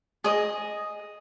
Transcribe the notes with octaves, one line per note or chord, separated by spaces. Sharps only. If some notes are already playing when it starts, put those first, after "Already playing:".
G#4 D#5